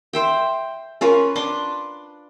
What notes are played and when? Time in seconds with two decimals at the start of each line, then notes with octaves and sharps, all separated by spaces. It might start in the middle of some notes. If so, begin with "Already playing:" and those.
0.13 C5 E5 G5
1.01 C#4 F4 A#4 B4
1.36 D4 B4 C6 D6